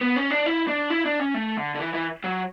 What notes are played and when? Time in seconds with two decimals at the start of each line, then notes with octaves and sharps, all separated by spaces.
0.01 B3
0.16 C#4
0.30 D4
0.46 E4
0.67 D4
0.90 E4
1.05 D4
1.20 C#4
1.34 A3
1.57 D3
1.75 D3
1.80 E3
1.94 E3
2.24 F#3